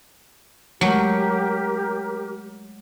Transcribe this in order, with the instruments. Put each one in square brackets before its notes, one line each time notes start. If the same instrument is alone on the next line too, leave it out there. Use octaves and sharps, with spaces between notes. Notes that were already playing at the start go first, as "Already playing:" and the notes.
[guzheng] F#3 [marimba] G#3 A3 [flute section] G4 A#4